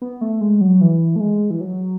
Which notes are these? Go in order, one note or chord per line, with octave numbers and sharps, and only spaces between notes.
B3
A3
G#3
F#3
E3
A3
G#3
E3
F#3